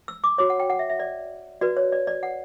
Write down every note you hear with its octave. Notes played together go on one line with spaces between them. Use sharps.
E6
D6
F#4 C#5 D6
F#5
G5
F#5
E5
E5
D5
F#4 B4 D5
C#5
D5
D5
F#5